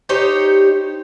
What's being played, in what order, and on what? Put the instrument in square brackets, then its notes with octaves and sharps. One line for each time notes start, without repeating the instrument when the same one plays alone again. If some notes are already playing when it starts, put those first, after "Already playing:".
[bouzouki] D#4 G4 C5 C#5